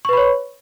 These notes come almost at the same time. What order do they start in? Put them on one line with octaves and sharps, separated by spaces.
C#6 B4 B5 C#5